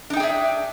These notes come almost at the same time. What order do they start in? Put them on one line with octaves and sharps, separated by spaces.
D4 D#4 G5 G#4 E5